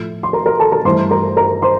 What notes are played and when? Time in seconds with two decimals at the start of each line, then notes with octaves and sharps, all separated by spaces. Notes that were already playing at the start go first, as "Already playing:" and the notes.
Already playing: A2 F3 A3
0.23 C6
0.33 A#4 A#5
0.46 A#4 A#5
0.59 A4 A5
0.72 A#4 A#5
0.85 G2 E3 A3 C5 C6
1.11 A#4 A#5
1.37 A#4 A#5
1.62 C5 C6